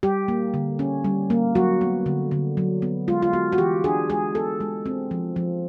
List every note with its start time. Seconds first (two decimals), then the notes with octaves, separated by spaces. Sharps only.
0.03 G3 G4
0.28 A#3
0.54 D3
0.79 C#4
1.04 G3
1.30 A#3
1.55 F#3 F#4
1.81 B3
2.06 D3
2.31 D3
2.57 F#3
2.82 B3
3.08 G#3 F4
3.22 F4
3.33 B3 F#4
3.52 F#4
3.58 E3 G4
3.84 D4 G#4
4.10 G#3 G#4
4.35 B3 A4
4.60 G#3
4.86 C4
5.11 F3
5.36 F3